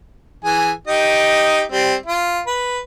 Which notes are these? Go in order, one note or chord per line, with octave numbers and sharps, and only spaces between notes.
E3 G#4 G#5
D#4 G4 D#5
G3 C4
F4
B4